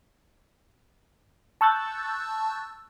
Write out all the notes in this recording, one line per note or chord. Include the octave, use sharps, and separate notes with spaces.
A5 C#6 E6 F#6 G6 A6